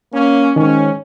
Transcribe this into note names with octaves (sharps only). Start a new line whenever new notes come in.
A#3 C#4
G#2 D#3 C#4